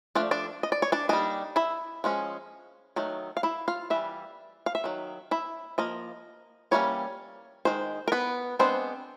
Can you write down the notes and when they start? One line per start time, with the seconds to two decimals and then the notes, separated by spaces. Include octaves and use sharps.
0.15 F3 A3 D4 D5
0.31 D4 D5
0.63 D#5
0.72 D5
0.82 C#5
0.92 D4 D5
1.09 G3 A#3 D4 D#4 D#5
1.56 E4 E5
2.04 F3 G#3 C#4
2.96 D#3 F#3 A3
3.37 F5
3.43 E4 E5
3.68 F4 F5
3.90 E3 G3 E5
4.66 F5
4.75 E5
4.84 D#3 F#3
5.31 E4 E5
5.78 F3 A#3 D#5
6.71 E3 G3 A#3 C#4 C#5
7.65 D#3 G#3 C5
8.08 A#4
8.12 B3 B4
8.59 G#3 B3 C4 D4 C5